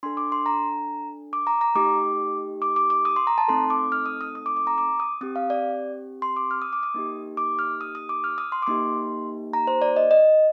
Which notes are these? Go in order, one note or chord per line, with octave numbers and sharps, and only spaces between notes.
D4 A4 C6
D6
C6
A#5
D6
A#5
A#5
A3 D#4 G4 D6
D6
D6
D6
D#6
C6
A#5
A5
A3 C4 D#4 A4 C6
D6
F6
D#6
D#6
D#6
D6
D6
A#5
D6
D#6
C4 G4 D#6
F5
D5
C6
D6
F6
D#6
D6
D#6
A#3 D#4 G4
D6
F6
D#6
D#6
D6
F6
D#6
C6
D6
A#3 D#4 G4 C6
A#5
C5
D5
D#5
D#5